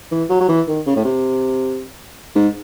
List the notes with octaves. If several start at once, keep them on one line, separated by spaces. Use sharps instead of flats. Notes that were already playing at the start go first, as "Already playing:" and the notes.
E3
F#3
F#3
E3
D#3
C#3
A2
C3
G#2